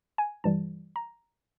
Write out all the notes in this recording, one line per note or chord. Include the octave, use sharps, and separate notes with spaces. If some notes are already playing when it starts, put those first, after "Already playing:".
G#5
G2 E3 G3 A5
A#5